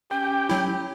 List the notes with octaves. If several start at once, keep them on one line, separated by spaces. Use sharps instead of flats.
C#4 G4 G5
F#3 E4